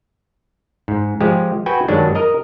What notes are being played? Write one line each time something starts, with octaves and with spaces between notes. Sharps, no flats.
G#2
F3 G#3 G4
F#4 B4 G5 G#5
G2 D#3 F#3 G#3 D4
A#4 D#5 A#5